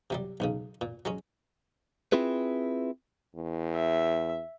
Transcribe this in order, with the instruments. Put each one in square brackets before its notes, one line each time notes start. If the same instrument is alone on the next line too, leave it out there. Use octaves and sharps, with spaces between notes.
[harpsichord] C3 F#3 G3
B1 G#2 C#3
A#2
F#3 G#3 C#4
[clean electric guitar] C4 E4 F4 G#4 B4
[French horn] E2
[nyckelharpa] E5